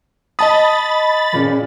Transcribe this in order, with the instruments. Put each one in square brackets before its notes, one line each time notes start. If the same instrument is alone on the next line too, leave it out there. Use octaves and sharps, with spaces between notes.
[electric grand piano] D#5 A5 D#6 [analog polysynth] B5 A6
[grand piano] F#1 A#2 C#3